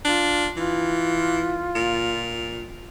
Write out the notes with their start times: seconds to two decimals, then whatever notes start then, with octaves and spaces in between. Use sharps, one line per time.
0.05 D4 F4
0.57 E3 F4
1.75 A#2